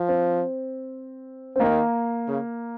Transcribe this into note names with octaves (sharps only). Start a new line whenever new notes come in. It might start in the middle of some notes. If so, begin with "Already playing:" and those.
Already playing: F3
C4
C4
D#3 A#3
C#3